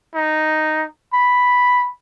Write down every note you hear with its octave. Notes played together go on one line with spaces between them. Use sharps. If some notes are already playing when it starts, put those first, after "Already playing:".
D#4
B5